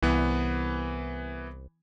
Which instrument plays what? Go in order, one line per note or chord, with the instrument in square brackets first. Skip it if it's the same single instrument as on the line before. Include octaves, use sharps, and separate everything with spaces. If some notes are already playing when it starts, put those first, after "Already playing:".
[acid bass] C2 [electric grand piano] E3 B3